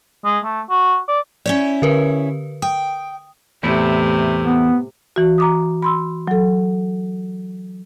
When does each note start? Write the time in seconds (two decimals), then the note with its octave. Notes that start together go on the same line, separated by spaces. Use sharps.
0.24 G#3
0.44 A3
0.70 F#4
1.08 D5
1.46 C#4 E4 C#5 D5
1.82 D3 A#4 B4
2.62 G5 D#6
3.63 E2 A2 C3 A3 E4
4.43 B3
5.16 E3 F#4
5.38 A#5 D6 D#6
5.82 B5 C6 E6
6.28 F#3 A4